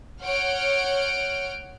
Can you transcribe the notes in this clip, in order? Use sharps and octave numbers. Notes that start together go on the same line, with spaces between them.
C#5 F#5 F6 G6 D7